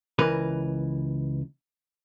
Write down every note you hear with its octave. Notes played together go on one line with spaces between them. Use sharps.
C#2 E3 A#4 B4